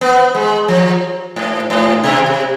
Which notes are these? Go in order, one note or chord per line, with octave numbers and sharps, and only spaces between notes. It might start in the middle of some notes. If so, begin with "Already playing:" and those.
B3
G#3
F3
G#2
G#2
B2
C3